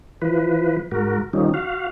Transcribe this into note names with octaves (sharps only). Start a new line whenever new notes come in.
E3 F3 B4
G#2 F#4 A#4
D#3 F3 G3 C#4 D#4
F#4 F5